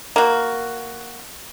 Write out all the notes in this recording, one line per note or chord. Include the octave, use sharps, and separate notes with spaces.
A#3 F#4